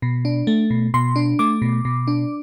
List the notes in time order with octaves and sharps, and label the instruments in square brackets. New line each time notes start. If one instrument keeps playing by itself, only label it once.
[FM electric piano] B2
D4
A3
B2
B2 C6
D4
A3 D6
B2
B2
D4